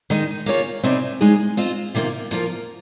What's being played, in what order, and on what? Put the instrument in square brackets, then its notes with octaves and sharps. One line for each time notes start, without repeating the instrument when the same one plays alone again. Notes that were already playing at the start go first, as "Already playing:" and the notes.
[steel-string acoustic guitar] D#3 G#3 D#4
A#3 F4 G#4 C#5
C3 G3 C4 D#4 G#4
G#3 D#4 G#4
C4 F4 C5 D#5
C3 D#3 A#3 F4
F3 A#3 F4 A#4